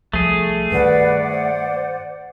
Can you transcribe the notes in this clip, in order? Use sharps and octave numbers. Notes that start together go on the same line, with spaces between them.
C2 F3 A3 G#4
G2 D#3 B4 D5 F#5
C5